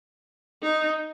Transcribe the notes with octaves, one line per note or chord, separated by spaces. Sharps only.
D#4